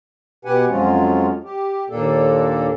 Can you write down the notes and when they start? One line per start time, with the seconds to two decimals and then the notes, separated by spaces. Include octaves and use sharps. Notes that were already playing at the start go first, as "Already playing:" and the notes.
0.45 B2 G4 B4 F#5 G#5
0.69 F2 F3 F#3 G#3 C#4 F4
1.44 G4
1.90 D#2 A#2 A#3 D4 A4